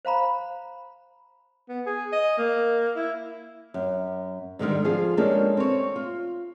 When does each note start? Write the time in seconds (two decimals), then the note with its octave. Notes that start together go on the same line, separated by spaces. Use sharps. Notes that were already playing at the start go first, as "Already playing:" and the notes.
0.05 C5 F5 A#5 B5
1.69 B3
1.86 G#4
2.12 D#5
2.38 A#3
2.96 E4
3.74 F#2
4.59 G#2 D3 D#3 G3
4.84 F3 F4 G#4
5.17 G#3 A#3 C#4 D4 G4 A4
5.57 C4 C#5
5.96 F4